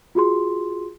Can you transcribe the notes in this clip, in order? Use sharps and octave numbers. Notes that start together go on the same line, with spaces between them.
F4 F#4 G#4 C6